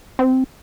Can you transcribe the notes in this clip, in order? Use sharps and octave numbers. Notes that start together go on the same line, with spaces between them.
C4